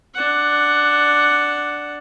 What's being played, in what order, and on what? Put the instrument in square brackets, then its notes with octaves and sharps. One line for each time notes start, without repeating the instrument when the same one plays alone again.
[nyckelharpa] D4 F#5